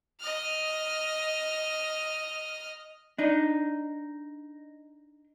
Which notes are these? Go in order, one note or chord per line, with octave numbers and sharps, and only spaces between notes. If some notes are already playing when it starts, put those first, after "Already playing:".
D#5 F6
D4 D#4